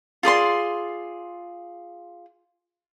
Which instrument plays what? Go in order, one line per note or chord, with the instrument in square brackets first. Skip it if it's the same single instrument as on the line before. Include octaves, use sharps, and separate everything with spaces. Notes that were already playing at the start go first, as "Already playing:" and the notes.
[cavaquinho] F4 G#4 D5 C6